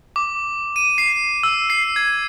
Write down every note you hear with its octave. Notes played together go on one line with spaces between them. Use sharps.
D6
D#7
C7
E6
C7
G#6